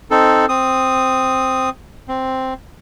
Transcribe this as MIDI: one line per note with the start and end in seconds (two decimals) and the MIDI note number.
0.11 0.46 60
0.11 0.46 63
0.11 0.46 69
0.49 1.70 60
0.49 1.70 87
2.08 2.54 60